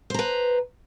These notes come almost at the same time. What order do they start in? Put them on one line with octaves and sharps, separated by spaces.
C5 A#5 B4